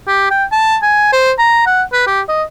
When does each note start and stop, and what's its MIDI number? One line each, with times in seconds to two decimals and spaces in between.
0.08 0.27 67
0.31 0.45 79
0.52 0.77 81
0.82 1.08 80
1.13 1.32 72
1.38 1.62 82
1.67 1.83 78
1.93 2.04 71
2.07 2.21 67
2.29 2.43 75